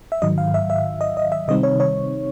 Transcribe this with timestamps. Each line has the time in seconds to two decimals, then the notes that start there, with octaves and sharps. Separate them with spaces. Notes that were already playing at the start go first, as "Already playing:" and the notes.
0.12 E5
0.22 G#2 D#3 F#3 D#5
0.38 F5
0.54 E5
0.70 E5
1.01 D#5
1.17 D#5
1.32 E5
1.48 C3 D#3 G3 C4 D#4 D#5
1.63 C#5
1.80 C#5